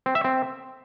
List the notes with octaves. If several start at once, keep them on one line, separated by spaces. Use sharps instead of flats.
C4
E5
C4